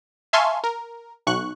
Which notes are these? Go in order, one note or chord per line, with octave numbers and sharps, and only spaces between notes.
E5 F5 G#5 A5 C6 C#6
A#4
B1 C#6 F#6